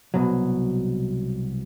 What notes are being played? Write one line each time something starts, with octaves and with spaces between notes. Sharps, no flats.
C2 B2 F#3